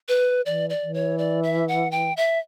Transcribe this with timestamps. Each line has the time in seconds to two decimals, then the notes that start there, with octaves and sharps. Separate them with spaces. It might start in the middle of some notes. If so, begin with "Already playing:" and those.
0.09 B4
0.46 E3 D5
0.70 D5
0.83 E3
0.94 C#5
1.18 D5
1.43 E5
1.68 F#5
1.91 G5
2.17 E5